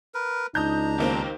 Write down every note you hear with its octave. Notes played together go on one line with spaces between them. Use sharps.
A#4 B4
C#2 D4 D#4 A#5 D#6 G6
D#2 D#3 A#3 C4